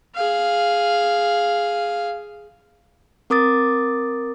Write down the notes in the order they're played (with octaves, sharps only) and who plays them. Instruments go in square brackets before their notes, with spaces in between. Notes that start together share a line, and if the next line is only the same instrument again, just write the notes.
[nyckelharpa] G#4 F5
[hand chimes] C4 A#4 D6 D#6 A6